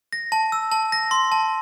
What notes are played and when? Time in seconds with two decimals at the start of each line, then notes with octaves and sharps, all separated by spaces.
0.13 A#6
0.32 A5
0.52 E6
0.72 A5
0.92 A#6
1.11 C6
1.32 A5